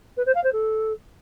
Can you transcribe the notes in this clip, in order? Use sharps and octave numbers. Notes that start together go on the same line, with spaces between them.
B4
C5
F5
C5
A4